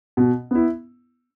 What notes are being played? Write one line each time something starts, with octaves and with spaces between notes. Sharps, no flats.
B2
B3 E4